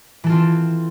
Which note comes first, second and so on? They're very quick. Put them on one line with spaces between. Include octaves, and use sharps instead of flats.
E3 A4 F4 C4